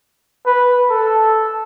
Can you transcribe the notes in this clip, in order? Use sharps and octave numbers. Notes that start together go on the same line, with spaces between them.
B4
A4